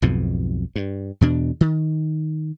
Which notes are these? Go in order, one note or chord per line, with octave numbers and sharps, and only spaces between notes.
B1 F2 G#2 B2
G2
E2 B2 D4
D#3